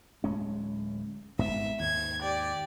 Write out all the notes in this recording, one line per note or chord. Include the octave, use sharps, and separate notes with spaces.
D1 G#3 C#4
G#1 G#2 B3 E5
D#2 G#2 G#6
G4 D5